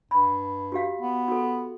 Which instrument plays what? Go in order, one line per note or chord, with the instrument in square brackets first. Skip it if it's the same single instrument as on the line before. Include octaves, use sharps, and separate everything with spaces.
[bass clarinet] G2 [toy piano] B5
[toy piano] F#4 G4 F5
[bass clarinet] B3
[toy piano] F#4 A4